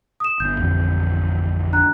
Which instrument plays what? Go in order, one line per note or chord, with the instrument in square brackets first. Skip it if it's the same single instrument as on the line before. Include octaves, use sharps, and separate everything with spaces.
[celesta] D#6 E7
[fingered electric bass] G1 D4 [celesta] G6
[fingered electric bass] A1 F2 D3
[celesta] D4 A#5 F#6